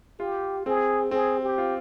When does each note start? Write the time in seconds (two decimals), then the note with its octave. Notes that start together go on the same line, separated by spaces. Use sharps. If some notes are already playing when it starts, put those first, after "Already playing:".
0.20 F4 G4
0.66 C4 G#4
1.11 C4 G#4
1.42 G4
1.58 F4